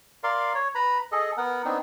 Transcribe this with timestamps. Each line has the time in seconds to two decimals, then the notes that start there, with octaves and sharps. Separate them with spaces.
0.24 A#4 D5 F5 C6
0.55 C#5
0.75 B4 A#5 B5
1.12 G#4 A4 D#5
1.37 B3 A#4 F#5
1.65 B3 C4 D4 D#4